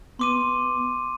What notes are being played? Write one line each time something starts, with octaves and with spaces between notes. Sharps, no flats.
B3 C6 D6 D#7